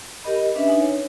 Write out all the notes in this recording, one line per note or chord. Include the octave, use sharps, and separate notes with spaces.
G4 A#4 D#5 B5
C#4 D4 B4 E5
D#4 G#5
C#5